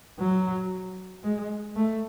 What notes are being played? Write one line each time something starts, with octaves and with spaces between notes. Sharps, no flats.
F#3
G#3
A3